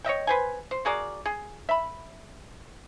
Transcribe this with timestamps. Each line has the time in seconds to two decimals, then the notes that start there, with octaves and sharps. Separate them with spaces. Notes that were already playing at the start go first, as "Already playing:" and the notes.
0.04 C#5 D#5 E5 G5
0.27 B4 C5 G#5
0.71 C5
0.85 F#4 G#4 A#4 D5
1.26 G#4
1.69 E5 B5